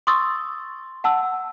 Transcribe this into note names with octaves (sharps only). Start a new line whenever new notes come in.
C6 C#6 D#6 E6 A6
F#5 A5 E6